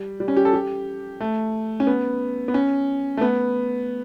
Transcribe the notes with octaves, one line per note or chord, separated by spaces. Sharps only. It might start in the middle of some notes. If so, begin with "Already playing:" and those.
Already playing: G3
G3
C#4
G4
A4
G4
A3
C#4
B3
B3
C#4
A3
B3